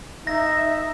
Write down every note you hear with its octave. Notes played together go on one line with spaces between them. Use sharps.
D#4 E5 A#6